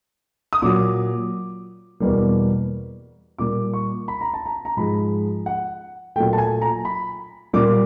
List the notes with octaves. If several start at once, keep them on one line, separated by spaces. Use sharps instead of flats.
D#6
A#2 F#3 A#3 D6
E2 B2 G3 A#3
A#2 G3 A#3 D6
C#6
B5
A#5
A5
A#5
A#5
G#2 F3 G#3 B5
F#5
A#2 F#3 A3 G5
A5
G#5
A#5
B5
A#2 G3 A#3 D6